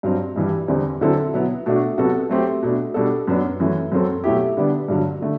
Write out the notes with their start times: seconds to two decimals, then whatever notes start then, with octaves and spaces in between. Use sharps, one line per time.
0.03 G2 F#3 C4
0.36 G2 E3 G3
0.68 E2 D3 G3 C4
1.01 D3 F#3 C4 E4 A4
1.34 B2 F#3 B3 E4
1.66 B2 A3 D4 F#4
1.98 C3 F#3 B3 F#4 A4
2.30 F#3 A3 C4 G4
2.63 B2 A3 D4
2.94 B2 G3 D4 F#4 A4
3.27 F#2 F#3 B3 D4
3.60 F#2 E3 A3
3.92 F#2 F#3 C4 F#4 A4
4.24 B2 F#3 A3 E4 G4
4.57 D3 G3 B3 D4
4.88 G2 D3 F#3
5.22 D3 A3